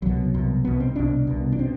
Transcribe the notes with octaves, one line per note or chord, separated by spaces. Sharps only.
C2 B2 F#3
C2 B2
C2 B2 B3
C4
C2 B2 D4
C2 B2
D4
B2 C4